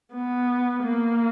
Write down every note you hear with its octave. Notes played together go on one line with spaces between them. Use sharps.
B3
A#3